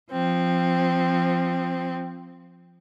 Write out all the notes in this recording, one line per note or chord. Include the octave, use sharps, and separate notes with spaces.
F3 C4